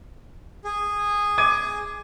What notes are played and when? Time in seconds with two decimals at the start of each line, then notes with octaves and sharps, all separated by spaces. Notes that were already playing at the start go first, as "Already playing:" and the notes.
0.64 G#4
1.38 D6 G#6 D#7